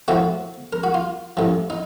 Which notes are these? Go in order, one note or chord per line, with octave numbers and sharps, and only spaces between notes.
A2 F3 A3 C4 F#4
A#4
F#4
F4
A1 A2 F3
D#4